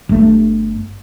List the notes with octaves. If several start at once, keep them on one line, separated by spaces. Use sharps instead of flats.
G1 A3